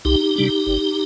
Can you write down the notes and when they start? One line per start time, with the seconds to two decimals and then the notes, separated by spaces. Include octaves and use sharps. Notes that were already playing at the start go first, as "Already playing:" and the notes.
0.05 C2 D#4 G4
0.36 C3 G3 D4
0.67 G1